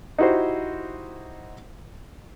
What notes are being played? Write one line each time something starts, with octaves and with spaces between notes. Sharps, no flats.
D#4 E4 F#4 G4 C5